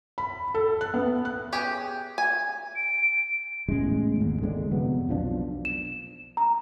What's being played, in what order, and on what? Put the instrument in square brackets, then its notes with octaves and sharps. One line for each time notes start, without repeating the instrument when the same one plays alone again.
[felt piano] B5
A4
F#6
B3
F#6
[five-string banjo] C#4 G4 G#4
G#5
[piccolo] D7
[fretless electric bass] E2 A2 C#3 G#3
G#1 D#2
D3 G#3 B3 D4
F2 C3 F#3 B3
B1 F3 D4
[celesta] E7
A#5